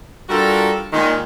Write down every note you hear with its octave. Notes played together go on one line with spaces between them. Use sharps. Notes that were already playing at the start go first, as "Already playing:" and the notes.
G3 D4 F4 F#4 A4 A#4
A#2 D#3 G#3